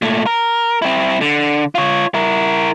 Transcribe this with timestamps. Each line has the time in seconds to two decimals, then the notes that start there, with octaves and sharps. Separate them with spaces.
0.02 A#2 A3
0.26 A#4
0.82 C4 E4
1.21 D3
1.75 F4 C#5
2.14 E4 A#4